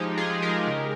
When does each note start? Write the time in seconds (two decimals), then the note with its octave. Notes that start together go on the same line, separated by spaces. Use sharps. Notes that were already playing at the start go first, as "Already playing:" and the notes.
Already playing: F3 G#3 D#4 G4
0.11 G#3
0.17 F4 G#4
0.30 G#3
0.42 G4 A#4
0.48 G#3
0.67 C#3